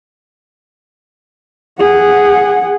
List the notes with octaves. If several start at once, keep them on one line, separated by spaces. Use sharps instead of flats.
G#4 F#5